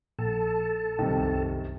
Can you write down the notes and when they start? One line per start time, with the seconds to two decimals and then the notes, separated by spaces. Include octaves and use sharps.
0.19 A#1 A4 A5
0.99 C2 F#2 C3 D#3